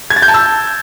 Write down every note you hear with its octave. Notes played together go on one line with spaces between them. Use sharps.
G#6
A6
G6
A5
E6